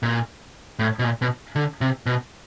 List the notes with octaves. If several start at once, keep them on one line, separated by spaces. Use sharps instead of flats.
A#2
A2
B2
A#2
B2
D3
C3
B2